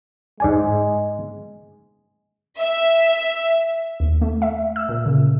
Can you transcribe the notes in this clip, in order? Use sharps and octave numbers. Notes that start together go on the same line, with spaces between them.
G#2 G#3 D5 G#5
E5
D#2
A3
E5
E6
A#2
C#3